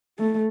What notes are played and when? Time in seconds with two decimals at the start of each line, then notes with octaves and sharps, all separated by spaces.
0.19 A3